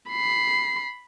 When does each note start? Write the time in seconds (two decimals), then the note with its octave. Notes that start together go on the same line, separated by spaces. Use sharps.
0.10 B5 C7